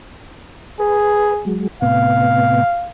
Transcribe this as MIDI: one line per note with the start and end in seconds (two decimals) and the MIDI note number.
0.80 1.47 68
0.80 1.34 71
1.45 1.67 54
1.45 1.67 56
1.82 2.64 45
1.82 2.64 48
1.82 2.64 59
1.82 2.91 77